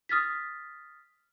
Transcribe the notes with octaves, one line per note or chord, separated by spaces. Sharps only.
D#6 F6 A6 B6